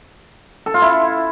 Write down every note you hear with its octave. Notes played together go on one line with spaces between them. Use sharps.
A4
F4
E4